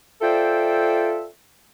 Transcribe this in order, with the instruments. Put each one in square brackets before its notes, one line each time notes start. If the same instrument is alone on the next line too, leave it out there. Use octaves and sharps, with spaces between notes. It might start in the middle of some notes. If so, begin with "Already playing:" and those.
[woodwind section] F4 A4 C5 D5 E5 G5